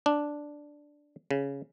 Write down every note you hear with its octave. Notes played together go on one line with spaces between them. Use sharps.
D4
C#3